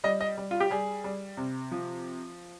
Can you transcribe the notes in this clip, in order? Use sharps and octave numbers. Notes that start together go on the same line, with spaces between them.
G3 D#5
D#5
G3
F4
G4
G3 G#4
G3
C3
F3